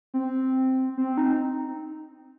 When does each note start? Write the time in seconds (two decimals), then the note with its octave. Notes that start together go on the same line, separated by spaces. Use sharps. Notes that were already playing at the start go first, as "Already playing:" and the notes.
0.14 C4
0.98 C4
1.18 D#4